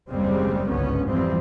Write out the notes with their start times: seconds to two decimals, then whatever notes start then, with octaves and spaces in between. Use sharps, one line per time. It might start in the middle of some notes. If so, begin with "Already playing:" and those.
0.10 F#1 D#2 C#3 G3 G#3 C4
0.68 G#1 C#2 G2 D3 B3 C#4
1.06 F2 E3 F3 G3 C4